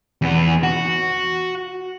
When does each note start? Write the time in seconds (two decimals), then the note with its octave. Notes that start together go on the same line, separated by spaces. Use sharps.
0.22 E2 B3
0.63 F#4